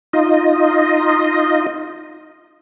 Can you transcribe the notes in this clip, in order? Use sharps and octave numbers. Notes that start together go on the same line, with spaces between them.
D#4 F4 D#5